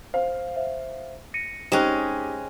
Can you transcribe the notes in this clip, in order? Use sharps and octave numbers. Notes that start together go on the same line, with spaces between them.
C5 F5
C5 E5
A#6 C#7 D#7
G#3 C#4 D#4 G4 C5 G5 F#6